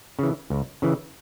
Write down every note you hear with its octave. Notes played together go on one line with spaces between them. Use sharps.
C#3 E3
C#2
C#3 E3